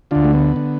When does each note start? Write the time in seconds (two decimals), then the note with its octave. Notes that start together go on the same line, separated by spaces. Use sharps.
0.11 D2 D3 D4 F4
0.24 A3
0.34 B3
0.56 D3